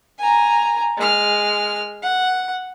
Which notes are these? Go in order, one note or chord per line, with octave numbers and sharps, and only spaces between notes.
G#5 A#5
G#3 F6
F#5